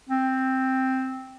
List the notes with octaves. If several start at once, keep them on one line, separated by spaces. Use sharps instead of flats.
C4